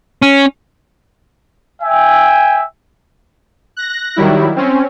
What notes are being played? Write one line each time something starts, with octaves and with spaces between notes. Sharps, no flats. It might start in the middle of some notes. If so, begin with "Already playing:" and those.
C#4
E5 G5 G#5
F#6 A#6
D#3 F#3 G3 E4
C4 C#4